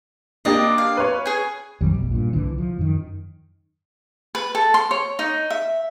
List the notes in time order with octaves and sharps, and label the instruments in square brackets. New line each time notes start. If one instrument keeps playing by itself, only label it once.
[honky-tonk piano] A#3 D4 G4 [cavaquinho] D5 D#5
[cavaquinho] F5
[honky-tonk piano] B4 C#5
[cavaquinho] G#4 G#5
[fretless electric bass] F2 D#3 F#3 G3
F1 B1
G2 A#2
C2 D3 E3
F3
F#2 D#3
[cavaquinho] B4
A4
C6
C#5
D#4
E5